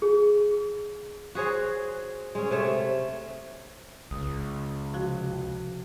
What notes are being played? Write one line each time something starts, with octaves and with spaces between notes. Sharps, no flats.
G#4
F#4 G#4 C5 C#5
G#3 C#4
C3 A3 C#5 E5
C#2 D#6
C3 F3 F#4